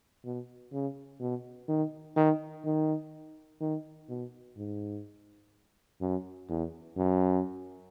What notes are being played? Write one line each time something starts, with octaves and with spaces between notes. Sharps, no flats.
B2
C#3
B2
D#3
D#3
D#3
D#3
B2
G#2
F#2
E2
F#2